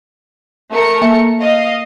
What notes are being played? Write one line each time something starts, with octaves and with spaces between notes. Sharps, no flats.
A3 A#4 C#7
A#3 E5
D#5 F5